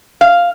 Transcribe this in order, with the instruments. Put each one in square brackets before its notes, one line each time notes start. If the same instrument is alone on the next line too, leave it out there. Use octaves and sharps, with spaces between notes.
[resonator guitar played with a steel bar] F5